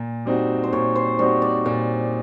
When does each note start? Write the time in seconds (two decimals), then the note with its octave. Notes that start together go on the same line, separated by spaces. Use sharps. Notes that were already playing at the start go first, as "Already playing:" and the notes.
Already playing: A#2
0.25 G3 C4 D#4 F#4
0.64 C5
0.73 A#2 C#5
0.95 C5
1.19 G3 C4 D#4 F#4 C#5
1.42 D5
1.66 A#2 D5